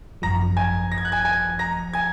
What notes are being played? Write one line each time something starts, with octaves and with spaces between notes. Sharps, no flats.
G#1 F#2 F3 A#5 A#6
G#5 G#6
A#6
G#6
F#6
G#5 G#6
G#5 G#6
A#5 A#6
G#5 G#6